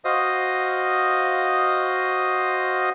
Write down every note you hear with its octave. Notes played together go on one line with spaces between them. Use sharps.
F#4 C5 D#5 F5 D#6